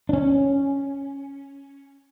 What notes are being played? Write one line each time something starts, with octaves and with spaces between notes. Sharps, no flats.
C#4 D4